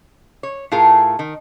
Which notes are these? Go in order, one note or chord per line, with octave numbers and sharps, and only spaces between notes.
C#5
A2 A3 F4 G#4 A#4
D#3